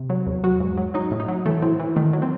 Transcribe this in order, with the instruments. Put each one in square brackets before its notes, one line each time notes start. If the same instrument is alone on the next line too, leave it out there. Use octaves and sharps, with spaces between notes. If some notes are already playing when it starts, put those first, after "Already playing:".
Already playing: [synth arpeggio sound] C3
F#3
E2
F#3 F#4
G#2
F#3
F#3 D#4
A2
D#4
F#3
E3 A3
A2 C4
E3
D#3 A3
F#3
C4